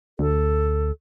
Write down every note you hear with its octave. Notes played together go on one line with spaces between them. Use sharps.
D2 A4